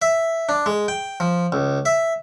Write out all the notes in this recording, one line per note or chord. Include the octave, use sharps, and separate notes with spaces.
E5
D4
G#3
G5
F3
C#2
E5